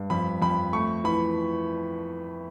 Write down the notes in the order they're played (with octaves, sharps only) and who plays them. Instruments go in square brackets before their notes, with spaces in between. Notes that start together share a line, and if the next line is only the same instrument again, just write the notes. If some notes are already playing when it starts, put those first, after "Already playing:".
Already playing: [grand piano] G2
F2 B5
F2 B5
A3 C#6
E3 B5